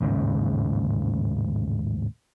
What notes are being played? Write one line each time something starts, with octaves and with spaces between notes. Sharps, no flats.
A1 D#2 G#2 C#3